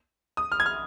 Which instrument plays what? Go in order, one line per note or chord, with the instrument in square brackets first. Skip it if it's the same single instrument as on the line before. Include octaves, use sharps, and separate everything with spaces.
[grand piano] D#6
F6
G#6
F6